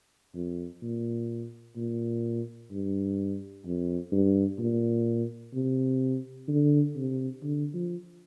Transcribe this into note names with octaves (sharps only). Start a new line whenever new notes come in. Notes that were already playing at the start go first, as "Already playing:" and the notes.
F2
A#2
A#2
G2
F2
G2
A#2
C3
D3
C3
D3
F3